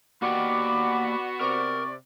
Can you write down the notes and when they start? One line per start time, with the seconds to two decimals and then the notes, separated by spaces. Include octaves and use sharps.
0.22 A#3 B3 F#4 G4 D5 G5 B5 D6
1.41 C3 C4 A#4 D5 C#6